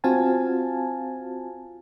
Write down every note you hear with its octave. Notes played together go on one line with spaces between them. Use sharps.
C4 F4 F#4 F5 G#5 A5